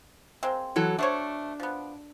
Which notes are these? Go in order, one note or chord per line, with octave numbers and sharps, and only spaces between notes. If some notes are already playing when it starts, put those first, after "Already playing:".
G#3 A#3 C4
E3 F#3 A4
A3 D4 C5 C#5
F3 B3